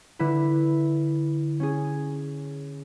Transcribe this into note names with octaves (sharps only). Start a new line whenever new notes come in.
D3 E4 B4
C#4 G#4